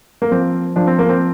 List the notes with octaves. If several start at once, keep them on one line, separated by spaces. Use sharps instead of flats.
A#3
F3 C4
F3 D4
C4
A#3
C4